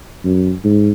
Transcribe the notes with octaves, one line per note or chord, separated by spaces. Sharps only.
F#2
G#2